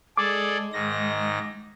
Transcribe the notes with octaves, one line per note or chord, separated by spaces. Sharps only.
G#3 G#4 A4 D5 D6
G#2 D#3 A#6